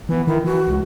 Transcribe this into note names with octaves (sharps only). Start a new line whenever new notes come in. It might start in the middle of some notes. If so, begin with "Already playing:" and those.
E3 B3
D#3 E4
E3 F#4
C#2